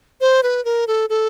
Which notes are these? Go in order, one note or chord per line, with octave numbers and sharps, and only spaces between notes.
C5
B4
A#4
A4
A4